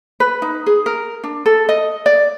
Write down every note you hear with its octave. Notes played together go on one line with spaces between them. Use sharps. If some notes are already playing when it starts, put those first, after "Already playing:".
B4
D#4
G#4
A#4
D4
A4
D#5
D5